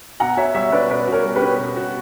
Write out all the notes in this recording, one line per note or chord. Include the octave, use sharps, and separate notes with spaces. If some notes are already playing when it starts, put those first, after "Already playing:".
B2 F#5 A#5
F#4 C#5 E5
G3 C#5 E5
C#4 B4 D5
B2 B4 D5
F#4 A#4 C#5
G3
G4 B4
C#4
B2
F#4